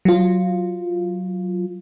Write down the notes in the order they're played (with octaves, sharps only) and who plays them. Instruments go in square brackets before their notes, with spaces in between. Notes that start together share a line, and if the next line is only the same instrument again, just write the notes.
[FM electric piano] F#3 F4